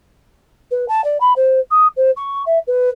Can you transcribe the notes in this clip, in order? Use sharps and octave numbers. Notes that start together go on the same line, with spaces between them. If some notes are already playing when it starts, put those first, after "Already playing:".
B4
A5
D5
B5
C5
D#6
C5
C#6
E5
B4